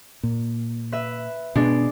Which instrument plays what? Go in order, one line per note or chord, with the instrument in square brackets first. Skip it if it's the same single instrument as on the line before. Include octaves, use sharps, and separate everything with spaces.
[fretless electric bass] A#2
[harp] B4 E5
[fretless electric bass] B2 [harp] G#3 D4